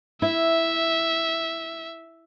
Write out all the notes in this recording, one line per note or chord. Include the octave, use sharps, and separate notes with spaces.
E4 E5